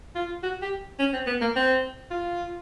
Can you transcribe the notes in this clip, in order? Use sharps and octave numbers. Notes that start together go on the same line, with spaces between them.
F4
F#4
G4
C#4
C4
B3
A#3
C4
F4